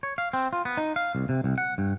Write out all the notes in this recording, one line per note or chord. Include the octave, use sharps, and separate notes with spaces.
C#5
F5
C4
F4
B3
D#4
F5
C2
C3
C2
F#5
G2